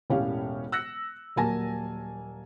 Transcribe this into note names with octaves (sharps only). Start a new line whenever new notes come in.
E1 A2 C#4 G4 C#5 F5
E6 F#6 A#6 C#7
D#1 F#3 A#3 G#5 A5 A#6